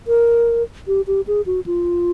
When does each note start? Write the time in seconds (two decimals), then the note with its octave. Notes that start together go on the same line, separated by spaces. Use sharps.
0.07 A#4
0.87 G4
1.07 G4
1.27 G#4
1.46 F#4
1.66 F4